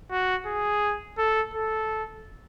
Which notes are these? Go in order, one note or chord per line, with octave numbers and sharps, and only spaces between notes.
F#4
G#4
A4
A4